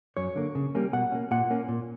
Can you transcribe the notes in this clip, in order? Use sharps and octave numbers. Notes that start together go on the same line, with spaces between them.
F#2 C#5
D3 A#3
C#3
G3 A#3 C#4
B2 F#5
A#3 C#4
A#2 F#5
A#3 C#4
A#2